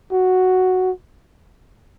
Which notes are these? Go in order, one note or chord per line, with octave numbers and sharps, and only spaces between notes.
F#4